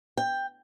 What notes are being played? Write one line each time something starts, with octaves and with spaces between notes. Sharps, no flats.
G5